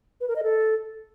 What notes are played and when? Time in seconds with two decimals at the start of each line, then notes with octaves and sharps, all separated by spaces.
0.21 B4
0.28 A#4
0.36 D#5
0.43 A4